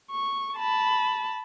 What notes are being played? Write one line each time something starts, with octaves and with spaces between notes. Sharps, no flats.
C#6
A5 B5